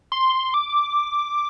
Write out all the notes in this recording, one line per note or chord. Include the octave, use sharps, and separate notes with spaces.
C6
D6